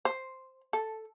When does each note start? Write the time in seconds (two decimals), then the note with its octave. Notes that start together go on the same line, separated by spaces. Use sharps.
0.05 C5
0.73 A4